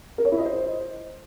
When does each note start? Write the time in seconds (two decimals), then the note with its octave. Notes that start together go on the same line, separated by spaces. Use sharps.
0.18 A#4
0.25 C#5
0.32 E4
0.38 D#5
0.45 C5